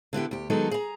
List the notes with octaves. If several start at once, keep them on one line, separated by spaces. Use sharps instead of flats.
D3 B3 E4 G4
D2 G4
D#3 F#3 G#3 B3 D#4 A4
G#4 A#5